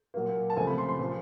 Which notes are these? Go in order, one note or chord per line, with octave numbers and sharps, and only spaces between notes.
A#2 F#3 A#3
A5
C#2 C3 F3 A3 G#5
B5
C6
C6
A#2 F3